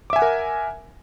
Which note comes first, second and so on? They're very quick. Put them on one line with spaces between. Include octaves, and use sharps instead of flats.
D6 E5 G#5 F#5 A#4